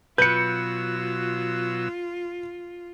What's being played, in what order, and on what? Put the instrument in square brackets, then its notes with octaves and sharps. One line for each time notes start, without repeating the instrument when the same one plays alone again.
[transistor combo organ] B2 F#3 E6 [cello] F4 [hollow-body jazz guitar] B4 [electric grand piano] G6 C#7